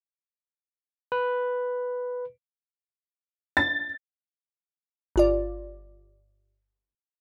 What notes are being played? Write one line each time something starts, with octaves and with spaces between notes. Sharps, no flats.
B4
A6
G1 F4 D5